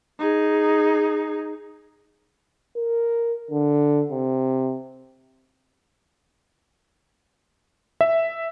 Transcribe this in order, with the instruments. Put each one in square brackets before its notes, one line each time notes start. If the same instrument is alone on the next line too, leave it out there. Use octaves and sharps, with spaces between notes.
[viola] D#4 G#4
[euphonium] A#4
D3
C3
[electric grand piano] E5